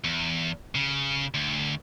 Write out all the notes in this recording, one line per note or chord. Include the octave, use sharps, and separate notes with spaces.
E2
C#3
D2